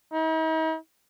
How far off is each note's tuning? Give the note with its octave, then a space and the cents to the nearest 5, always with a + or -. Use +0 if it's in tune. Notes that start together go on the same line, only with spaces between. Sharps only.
D#4 +45